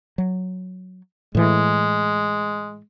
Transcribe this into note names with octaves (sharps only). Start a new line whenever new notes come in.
F#3
A2 E3 G#3